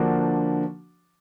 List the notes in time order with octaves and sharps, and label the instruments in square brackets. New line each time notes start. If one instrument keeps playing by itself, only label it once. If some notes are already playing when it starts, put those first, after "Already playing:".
Already playing: [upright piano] D3 F3 A#3 D4 F#4